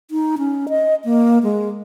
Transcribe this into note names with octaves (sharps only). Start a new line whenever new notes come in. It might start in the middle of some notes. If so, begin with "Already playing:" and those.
D#4
C#4
D#5
A#3
G#3